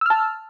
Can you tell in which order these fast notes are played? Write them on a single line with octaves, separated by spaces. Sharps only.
E6 F6 A5